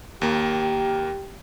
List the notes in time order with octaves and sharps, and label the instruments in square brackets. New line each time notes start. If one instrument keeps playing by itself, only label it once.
[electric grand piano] D#2 A#3 [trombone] G4